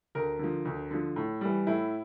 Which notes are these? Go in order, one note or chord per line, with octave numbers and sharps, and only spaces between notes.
D2 A#4
D3 F3
D2
D3 F3
A2
E3 G3
A2 E4